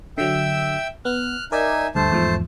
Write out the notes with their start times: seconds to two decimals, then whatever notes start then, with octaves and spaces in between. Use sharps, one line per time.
0.18 D3 F#3 E5 G5 E6
1.05 B3 F6 F#6
1.52 D#4 A#4 D5 E5 G#5
1.95 D2 G2 A3 C5 A5
2.11 E2 G#2 F3